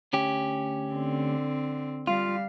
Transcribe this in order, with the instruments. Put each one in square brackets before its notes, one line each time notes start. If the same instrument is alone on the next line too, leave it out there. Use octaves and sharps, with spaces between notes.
[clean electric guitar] D2 C#4 G4
[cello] D3 C4
[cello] G3 F5 [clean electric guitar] F4